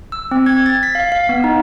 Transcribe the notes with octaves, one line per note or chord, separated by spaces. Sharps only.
E6
C4
G#6
A6
B6
F5
F5
B3
D#4